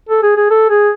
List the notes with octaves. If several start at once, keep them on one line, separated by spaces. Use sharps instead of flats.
A4
G#4
G#4
A4
G#4